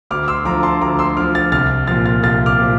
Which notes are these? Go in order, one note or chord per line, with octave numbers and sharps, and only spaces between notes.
D2 D6 F6
C6 E6
D3 F3 A#5 D6
A5 C6
D2 A#5 D6
C6 E6
D3 F3 D6 F6
F6 A6
C2 F6 A6
A#2 F3 F6 A6
F6 A6
C2 F6 A6
D6 F6
A#2 F3